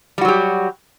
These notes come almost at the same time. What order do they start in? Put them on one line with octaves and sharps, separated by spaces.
G3 F#4 F#3 G4